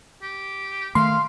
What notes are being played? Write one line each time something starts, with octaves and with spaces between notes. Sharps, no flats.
G4
D#3 A3 F5 C6